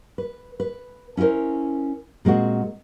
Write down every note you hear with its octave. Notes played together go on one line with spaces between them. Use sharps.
B4
B4
C#4 E4 A4 A#4 C5
A#2 G#3 C4 F#4